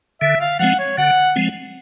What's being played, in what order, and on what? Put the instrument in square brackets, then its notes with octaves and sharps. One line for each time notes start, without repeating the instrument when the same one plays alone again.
[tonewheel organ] D3 [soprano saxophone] E5
[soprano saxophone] F5
[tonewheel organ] F3 G#3 C4 [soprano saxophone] F#5
[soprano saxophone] C#5
[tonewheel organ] D3 [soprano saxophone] F#5
[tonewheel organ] F3 G#3 C4